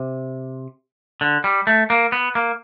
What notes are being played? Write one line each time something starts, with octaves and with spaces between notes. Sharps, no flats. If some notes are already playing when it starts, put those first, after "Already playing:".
Already playing: C3
D3
G3
A3
A#3
B3
A#3